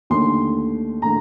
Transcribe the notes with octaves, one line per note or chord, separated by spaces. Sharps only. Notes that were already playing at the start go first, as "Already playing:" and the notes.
D#2 D3 A3 C6
D3 A3 A#5